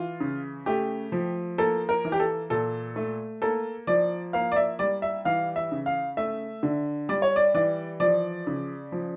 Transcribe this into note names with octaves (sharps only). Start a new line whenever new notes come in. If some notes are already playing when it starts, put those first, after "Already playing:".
Already playing: E3 F4
C#3
A3 G4
F3
A#3 A4
A#4
E3
G4
A4
A#2 A4
A3
A#3 A4
F3 D5
A#3 F5
D5
E5
G3 D5
E5
E3 F5
E5
C#3
F5
A3 E5
D3
G3 D5
C#5
D5
E3 D5
F3 D5
C#3
F3